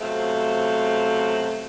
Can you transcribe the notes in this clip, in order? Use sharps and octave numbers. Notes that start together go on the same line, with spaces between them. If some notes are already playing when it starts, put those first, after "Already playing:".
C3 F#3 A3 B3 C5 F5